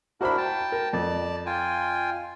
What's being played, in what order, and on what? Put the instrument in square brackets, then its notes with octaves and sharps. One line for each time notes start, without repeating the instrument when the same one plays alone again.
[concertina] D4 E4 A#4 [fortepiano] F#4 C5 B5
[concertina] G5 A5
[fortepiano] A#4
[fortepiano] F2 [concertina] D5 A5
[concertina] F4 G5 G#5